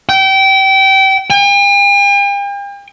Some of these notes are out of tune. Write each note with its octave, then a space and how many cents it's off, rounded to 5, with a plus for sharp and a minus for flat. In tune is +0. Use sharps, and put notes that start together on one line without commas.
G5 -25
G5 +45